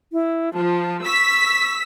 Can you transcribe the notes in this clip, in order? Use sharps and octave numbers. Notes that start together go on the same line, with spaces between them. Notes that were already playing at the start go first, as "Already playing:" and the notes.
E4
F3 A5
C#6 E6 B6